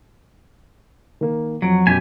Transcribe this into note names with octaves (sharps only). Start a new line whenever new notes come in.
D#3 A#3
F2 F#3 D7
F#2 B2 G4 G#5 B6